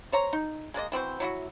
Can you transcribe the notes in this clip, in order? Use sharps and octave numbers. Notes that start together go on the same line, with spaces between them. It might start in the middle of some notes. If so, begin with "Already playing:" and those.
C5 C#5 A#5
D#4
G#3 A#3 D5 D#5
E3 C4 F#4 C5
F#3 E4 F#4